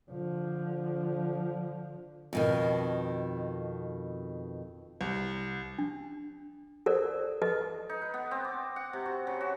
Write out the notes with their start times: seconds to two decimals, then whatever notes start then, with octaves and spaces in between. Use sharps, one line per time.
0.11 D3 F3
2.33 F2 B2 D#3
5.01 C2
5.79 D4
6.86 A4 A#4 C5 D5
7.42 A4 B4 D#5
7.89 D#4
8.02 B4
8.14 B3
8.31 C4
8.44 D6
8.76 F#5
8.93 C3
9.06 F#4
9.27 C#3
9.41 F#4